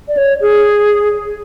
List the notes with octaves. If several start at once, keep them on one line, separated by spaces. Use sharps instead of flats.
D5
C#5
G#4